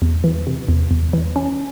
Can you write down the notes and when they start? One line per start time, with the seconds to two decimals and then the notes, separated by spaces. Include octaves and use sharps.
0.02 E2
0.24 E3
0.47 C3
0.69 E2
0.91 E2
1.13 E3
1.36 C#4